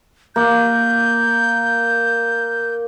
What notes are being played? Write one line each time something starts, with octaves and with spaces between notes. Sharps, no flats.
A#3 G6